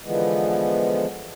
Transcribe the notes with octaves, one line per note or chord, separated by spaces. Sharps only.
D3 E3 F3 G#3 B3